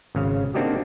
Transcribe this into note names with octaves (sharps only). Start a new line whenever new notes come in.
G#1 C#3 F5
A#3 C4 D4 D#4 F#4 G4